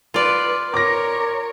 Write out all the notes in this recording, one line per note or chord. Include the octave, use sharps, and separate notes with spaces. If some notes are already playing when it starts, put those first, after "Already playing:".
F4 B4 D5
A#4 C#5 D6 A#6